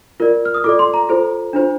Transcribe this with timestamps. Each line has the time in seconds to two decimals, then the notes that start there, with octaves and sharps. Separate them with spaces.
0.20 F4 A#4 D5
0.45 F6
0.54 D#6
0.64 F4 A4 D5 D6
0.79 C6
0.94 A#5
1.09 F4 A4 C5
1.53 D4 F4 C5